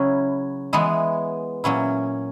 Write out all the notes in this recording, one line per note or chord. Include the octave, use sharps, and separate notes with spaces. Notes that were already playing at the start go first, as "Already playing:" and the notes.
Already playing: C#3 F#3 C#4 E4
E3 G#3 B3 E4
A#2 F#3 C#4 E4